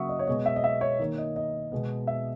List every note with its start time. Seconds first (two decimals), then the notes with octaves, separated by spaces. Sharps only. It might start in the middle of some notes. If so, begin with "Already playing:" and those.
Already playing: C#3 F#3 A#3 E5 F#5 C#6 D#6
0.09 D#5
0.19 C#5
0.27 B2 G#3 B3 D#5
0.46 E5
0.56 D#5
0.64 E5
0.81 C#5
0.99 D#3 A#3
1.18 D#5
1.36 D#5
1.72 B2 G#3 B3
2.07 E5